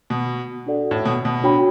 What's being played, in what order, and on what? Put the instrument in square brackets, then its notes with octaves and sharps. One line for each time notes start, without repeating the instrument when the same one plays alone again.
[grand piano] B2
[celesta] D4 F#4 A4 D5 F#5
[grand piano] A2
B2
B2
[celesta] D4 F#4 C#5 G5 B5